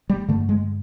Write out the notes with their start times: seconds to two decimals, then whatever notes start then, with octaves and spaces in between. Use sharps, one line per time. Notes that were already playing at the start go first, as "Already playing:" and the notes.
0.10 G3
0.28 G2 D3 A3
0.49 G#3